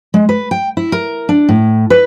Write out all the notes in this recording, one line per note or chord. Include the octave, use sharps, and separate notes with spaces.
G#3
B4
G5
E4
A#4
D4
A2
B4